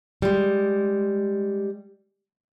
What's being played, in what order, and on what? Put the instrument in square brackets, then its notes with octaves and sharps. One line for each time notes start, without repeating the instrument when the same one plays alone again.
[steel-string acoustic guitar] G3 G#3